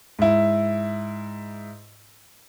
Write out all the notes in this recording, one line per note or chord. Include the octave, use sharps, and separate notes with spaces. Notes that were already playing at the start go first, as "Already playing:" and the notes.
G#2 E4